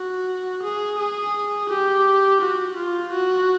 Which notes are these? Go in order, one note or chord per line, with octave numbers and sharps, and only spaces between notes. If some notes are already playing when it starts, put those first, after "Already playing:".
Already playing: F#4
G#4
G#4
G4
F#4
F4
F#4